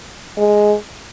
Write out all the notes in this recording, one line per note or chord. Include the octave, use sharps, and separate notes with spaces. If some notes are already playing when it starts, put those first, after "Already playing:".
G#3